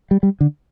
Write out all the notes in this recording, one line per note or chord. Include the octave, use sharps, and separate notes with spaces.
G3
G3
D3